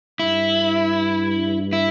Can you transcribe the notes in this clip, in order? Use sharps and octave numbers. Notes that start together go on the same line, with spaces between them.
G2 E4
E4